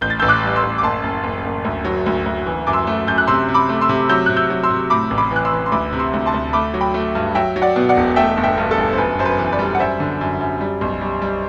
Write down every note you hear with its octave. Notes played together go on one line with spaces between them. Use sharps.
A1 G6
A6
A1 E6 G6
D6 F#6
G3
C6 E6
A1
D6
F#1 A5 C6
F#1
F#1
F#1
D2
F#3
D2
D2
E3
F#2 D6
C6 E6
A3
F#2 G6
F#6
C3 C6 E6
C3
B5 D6
A3
C6 E6
C3
F#3 E6 G6
C3 F#6
E6 G6
F#3
C6 E6
C3
A2 B5 D6
A1
B5 D6
E3
F#6
C6 E6
E3
C6
D2 B5 D6
C3
C6 E6
D2
A5 C6
D2
A3 B5 D6
F#3
G5 B5
A3
G2
F#3 E5 G5
F#3
D5 F#5
B2
D5 F#5
E1
A3 E5 G5
G1
E5 G5
G2
A4
G1
C5
F#2 B4
F#2 C5
B4
E3
B4 D5
G3
F#5
F#2 C5 E5
D3
F#2
F#2
G3
B1
G3
G3